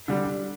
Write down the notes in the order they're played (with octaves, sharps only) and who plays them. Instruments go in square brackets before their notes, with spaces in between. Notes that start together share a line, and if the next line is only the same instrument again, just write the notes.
[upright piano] D3 G3